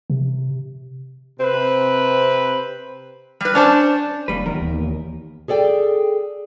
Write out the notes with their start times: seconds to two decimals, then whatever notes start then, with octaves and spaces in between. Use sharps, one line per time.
0.10 C3
1.40 C3 C4 B4
3.41 G3 B4
3.55 C#4 D4 C5 A5
4.28 F1 D#2 G3 B4
4.46 D#1 E2 D#3 A#4
4.60 D#2
5.48 G#4 A4 D5 G5